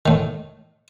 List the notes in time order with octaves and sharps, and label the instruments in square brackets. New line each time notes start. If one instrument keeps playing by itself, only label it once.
[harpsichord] A2 D#3